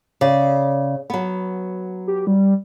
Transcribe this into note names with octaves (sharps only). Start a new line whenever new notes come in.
C#3 D5
F#3 B3
G4
G3